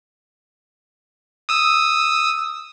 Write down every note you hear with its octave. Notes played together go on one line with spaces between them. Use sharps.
D#6 E6